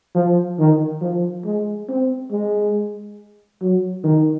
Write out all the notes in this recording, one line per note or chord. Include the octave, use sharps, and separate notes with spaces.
F3
D#3
F3
G#3
C4
G#3
F#3
D#3